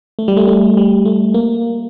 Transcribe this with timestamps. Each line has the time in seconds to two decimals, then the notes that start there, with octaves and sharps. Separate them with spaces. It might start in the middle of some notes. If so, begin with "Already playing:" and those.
0.19 A3
0.28 G3
0.37 A3
0.48 A3
0.77 G3
1.05 A3
1.34 A#3